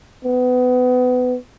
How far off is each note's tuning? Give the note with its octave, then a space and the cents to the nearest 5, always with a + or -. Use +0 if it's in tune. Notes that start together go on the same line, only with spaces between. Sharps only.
B3 +25